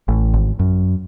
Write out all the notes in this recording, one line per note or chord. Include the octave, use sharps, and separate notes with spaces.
A1
G#1
F#2